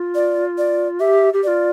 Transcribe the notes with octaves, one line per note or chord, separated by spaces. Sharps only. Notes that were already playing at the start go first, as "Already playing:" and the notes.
Already playing: F4
D5
D5
G4 E5
G4
F4 G4 D5